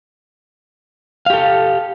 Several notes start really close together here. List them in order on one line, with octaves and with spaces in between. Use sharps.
F5 G4 A4